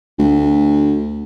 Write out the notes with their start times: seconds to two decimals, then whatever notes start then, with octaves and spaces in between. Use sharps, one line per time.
0.19 D2